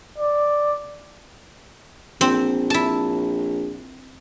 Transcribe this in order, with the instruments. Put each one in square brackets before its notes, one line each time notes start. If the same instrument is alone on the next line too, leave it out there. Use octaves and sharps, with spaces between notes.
[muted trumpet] D5
[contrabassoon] A#1 [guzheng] C4
[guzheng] E4 A5